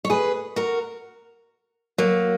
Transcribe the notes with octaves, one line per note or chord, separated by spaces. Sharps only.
C#5
G#4 B4
F#4 A#4
F#3 A#3